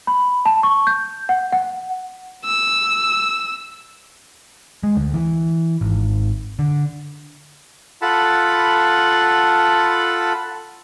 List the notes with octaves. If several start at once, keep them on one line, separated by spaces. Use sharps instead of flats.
B5
A5
C#6
G6
F#5
F#5
E6
G#3
D2
E3
G#1
D3
F4 A4 F#5 A5 B5